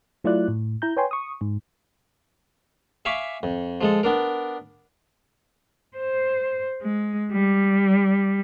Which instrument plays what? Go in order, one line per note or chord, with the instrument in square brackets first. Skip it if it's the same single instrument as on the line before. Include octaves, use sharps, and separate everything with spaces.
[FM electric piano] F#3 A3 E4 F4 D5 F#6
A2
E4 A#5 G6
B4 C#5 G5 G#5 C6
C#6 D#6
G#2
[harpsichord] E5 F5 G#5 B5 C#6 D6
F2
F3 G#3 A4
B3 D4 A#4
[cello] C5
G#3
G3